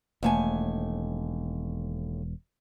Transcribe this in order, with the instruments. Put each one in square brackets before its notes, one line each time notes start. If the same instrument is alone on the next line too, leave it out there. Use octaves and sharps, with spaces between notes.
[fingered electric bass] E1 [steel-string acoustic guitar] D#2 A3 G#5